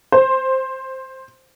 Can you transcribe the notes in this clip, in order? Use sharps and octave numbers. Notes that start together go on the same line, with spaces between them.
C5